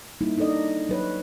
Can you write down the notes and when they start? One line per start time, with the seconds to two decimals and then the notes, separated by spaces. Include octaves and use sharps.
0.21 G3 A#3 D#4 E4
0.37 D4 D#4 A4 D5 D#5
0.89 F#3 B4 C#5